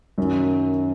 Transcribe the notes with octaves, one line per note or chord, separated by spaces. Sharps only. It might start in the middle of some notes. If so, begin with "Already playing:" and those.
F#2 D#3 F#3